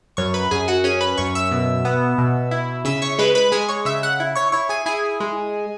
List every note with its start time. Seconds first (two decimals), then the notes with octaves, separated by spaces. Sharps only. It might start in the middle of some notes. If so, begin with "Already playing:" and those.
0.17 F#2 C#5 C#6
0.34 B4 B5
0.51 F#2 G#4 G#5
0.68 F#4 F#5
0.84 C#4 G#4 G#5
1.01 B4 B5
1.17 F#2 C#5 C#6
1.35 E5 E6
1.51 B2
1.85 B3
2.18 B2
2.51 E4
2.85 C#3 E5 E6
3.02 C#5 C#6
3.19 G#3 B4 B5
3.35 B4 B5
3.52 G#3 G#4 G#5
3.68 C#5 C#6
3.85 C#3 E5 E6
4.03 F#5 F#6
4.20 E4
4.35 C#5 C#6
4.52 E4 C#5 C#6
4.69 G#4 G#5
4.86 E4 G#4 G#5
5.20 G#3